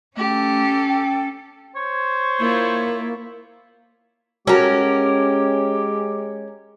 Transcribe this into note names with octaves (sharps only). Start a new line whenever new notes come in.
A3 C#4 G4 A4
G5
C5 C#5
A#3 E4 F4
G#3 C#4 F#4 G4 A4 A#4